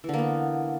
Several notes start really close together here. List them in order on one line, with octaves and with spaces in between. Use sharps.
E3 D3 A#3 B3